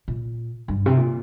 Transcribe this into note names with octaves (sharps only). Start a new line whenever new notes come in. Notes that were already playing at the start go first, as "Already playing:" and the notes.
A#2
G2
C3
A#2